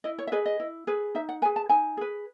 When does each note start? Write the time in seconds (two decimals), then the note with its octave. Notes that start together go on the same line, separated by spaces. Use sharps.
0.04 E4 D#5
0.19 C#5
0.27 E5
0.32 G#4 B4 D#5
0.46 D#5
0.60 E4
0.87 G#4 B4
1.15 D#4 E5
1.29 F#5
1.42 B4 G#5
1.45 G#4
1.56 A5
1.69 D#4 G#5
1.97 G#4 B4